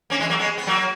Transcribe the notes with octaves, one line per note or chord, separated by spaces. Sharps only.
A#3 C#4
E3 G#3
F#3 A#3
G#3 B3
B3
F#3 A#3